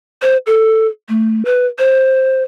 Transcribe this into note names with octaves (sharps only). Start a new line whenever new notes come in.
C5
A4
A3
B4
C5